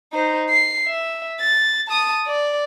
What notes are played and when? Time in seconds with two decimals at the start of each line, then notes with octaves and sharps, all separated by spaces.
0.12 D#4 C5
0.50 C7
0.87 E5
1.41 A6
1.88 A5 D#6
2.27 D5